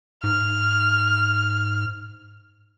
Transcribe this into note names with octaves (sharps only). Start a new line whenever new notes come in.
G#2 F6